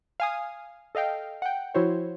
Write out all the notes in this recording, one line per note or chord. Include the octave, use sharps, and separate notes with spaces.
F5 G#5 D#6
A4 D#5 F5 G5
F#5 G5
F3 E4 F#4 C5 C#5